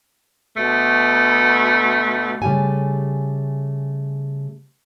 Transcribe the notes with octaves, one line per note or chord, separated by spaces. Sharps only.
D2 B2 A3
C#3 G3 A3 G4 G#5